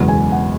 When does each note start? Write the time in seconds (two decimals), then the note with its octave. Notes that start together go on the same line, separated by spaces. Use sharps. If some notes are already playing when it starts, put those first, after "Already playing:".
Already playing: F#1 E2 B2 G#3 F#5
0.08 G#5
0.32 F#5